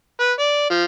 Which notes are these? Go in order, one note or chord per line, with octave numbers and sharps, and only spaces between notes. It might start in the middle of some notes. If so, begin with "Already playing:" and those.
B4
D5
F3